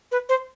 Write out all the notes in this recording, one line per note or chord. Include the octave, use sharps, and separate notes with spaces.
B4
C5